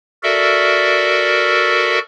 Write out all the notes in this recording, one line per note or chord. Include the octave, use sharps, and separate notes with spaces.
F#4 A4 A#4 D5 E5